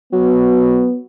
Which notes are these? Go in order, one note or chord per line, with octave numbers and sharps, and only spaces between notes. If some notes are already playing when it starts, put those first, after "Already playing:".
F#3 B3